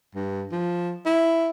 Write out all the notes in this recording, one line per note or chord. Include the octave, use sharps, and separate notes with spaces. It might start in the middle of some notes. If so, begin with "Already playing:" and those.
G2
F3
E4